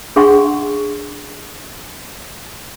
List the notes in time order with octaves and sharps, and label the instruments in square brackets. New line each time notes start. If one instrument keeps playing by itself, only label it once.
[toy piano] D4 G#4 F#5 G5 C6 C#6